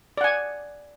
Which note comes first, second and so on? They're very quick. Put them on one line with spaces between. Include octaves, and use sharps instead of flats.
D5 F#5 G#5